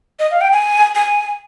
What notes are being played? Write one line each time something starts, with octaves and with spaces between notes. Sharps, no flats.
D#5
F5
G5
G#5
G#5